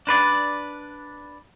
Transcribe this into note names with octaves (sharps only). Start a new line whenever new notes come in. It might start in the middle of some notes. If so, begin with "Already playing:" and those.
D4 B4 D5